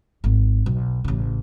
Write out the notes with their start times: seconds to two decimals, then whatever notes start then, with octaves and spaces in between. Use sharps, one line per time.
0.24 G#1
0.66 B1
1.04 A1 C#3